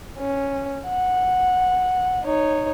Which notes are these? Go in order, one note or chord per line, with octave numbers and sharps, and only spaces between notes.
C#4
F#5
D#4 C#5